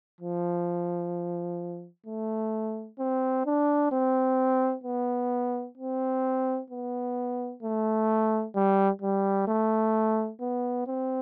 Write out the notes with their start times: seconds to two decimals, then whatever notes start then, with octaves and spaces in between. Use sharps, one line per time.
0.21 F3
2.07 A3
2.99 C4
3.46 D4
3.92 C4
4.84 B3
5.77 C4
6.70 B3
7.63 A3
8.55 G3
9.02 G3
9.48 A3
10.41 B3
10.87 C4